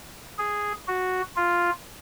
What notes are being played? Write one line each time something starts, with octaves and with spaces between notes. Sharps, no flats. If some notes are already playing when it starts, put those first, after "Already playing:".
G#4
F#4
F4